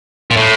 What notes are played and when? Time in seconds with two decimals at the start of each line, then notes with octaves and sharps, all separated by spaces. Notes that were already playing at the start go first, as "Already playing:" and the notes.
0.31 A#2
0.37 A2